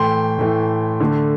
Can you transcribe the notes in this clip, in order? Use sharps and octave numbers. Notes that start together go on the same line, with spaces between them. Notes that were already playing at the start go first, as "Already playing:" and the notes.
Already playing: A2 E3 A3 G5 C6
A2 E3 A3
D3 A3